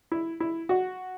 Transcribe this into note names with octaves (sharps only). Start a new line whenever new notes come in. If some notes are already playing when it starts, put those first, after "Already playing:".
E4
E4
F#4